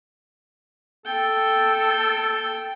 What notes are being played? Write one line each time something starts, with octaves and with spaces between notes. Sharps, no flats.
A4 G5